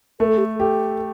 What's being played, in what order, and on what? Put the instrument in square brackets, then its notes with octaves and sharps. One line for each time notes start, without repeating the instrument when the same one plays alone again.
[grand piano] A3 [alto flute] A#4
[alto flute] A4
G4
A4
[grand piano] G4 [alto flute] A4